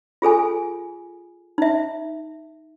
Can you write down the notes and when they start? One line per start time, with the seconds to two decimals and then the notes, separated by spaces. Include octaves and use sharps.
0.22 F4 G#4 A4 G#5
1.58 D#4 E5